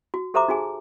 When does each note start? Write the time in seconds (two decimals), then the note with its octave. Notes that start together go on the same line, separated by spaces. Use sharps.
0.14 F#4
0.34 G4 A4 C5 E5 A#5 D6
0.48 D#4 F#4 G#4 G#5